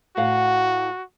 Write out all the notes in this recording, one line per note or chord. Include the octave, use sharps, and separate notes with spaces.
A2 F#4 F5 F#5